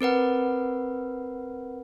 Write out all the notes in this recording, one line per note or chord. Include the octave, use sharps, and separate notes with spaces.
C4 A#4 B4 F#5